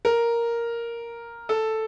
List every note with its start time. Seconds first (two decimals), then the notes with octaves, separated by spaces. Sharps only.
0.05 A#4
1.49 A4